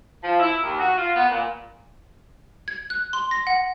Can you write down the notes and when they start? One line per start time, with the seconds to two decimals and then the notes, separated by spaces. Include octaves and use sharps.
0.23 F3
0.40 E4
0.63 D#2
0.79 F#4
0.98 F4
1.15 B3
1.30 A#2
2.68 G#6
2.90 F#6
3.13 C6
3.31 A#6
3.47 F#5